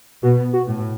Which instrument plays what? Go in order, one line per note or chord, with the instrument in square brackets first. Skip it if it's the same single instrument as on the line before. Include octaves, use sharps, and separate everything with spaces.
[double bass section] B2 B3 [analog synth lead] F#4
[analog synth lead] F#4
[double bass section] A2